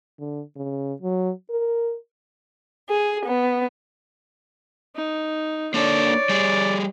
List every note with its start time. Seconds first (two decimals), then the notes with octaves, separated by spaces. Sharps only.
0.19 D3
0.56 C#3
1.02 F#3
1.50 A#4
2.88 G#4
3.25 B3
4.96 D#4
5.74 A#3 D4 A4 C#5 D5
6.29 G3 G#4